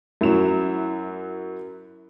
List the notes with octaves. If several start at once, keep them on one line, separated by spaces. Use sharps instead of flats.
F#2 F#3 E4 E7